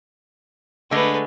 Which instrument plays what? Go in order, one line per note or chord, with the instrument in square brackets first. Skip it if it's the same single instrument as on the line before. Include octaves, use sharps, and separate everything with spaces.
[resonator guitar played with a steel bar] D3 G#3 [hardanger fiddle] A3 B4